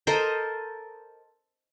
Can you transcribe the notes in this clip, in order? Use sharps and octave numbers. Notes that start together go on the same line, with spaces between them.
A4 A#4 C5 D#5